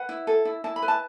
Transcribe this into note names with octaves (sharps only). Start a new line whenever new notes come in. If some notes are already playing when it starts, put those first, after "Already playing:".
Already playing: B4 F#5
E4
A4
E4
E4 A5
B5
B4
A5